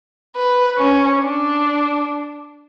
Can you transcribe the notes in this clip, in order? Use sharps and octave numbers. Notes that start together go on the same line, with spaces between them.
B4
C#4
D4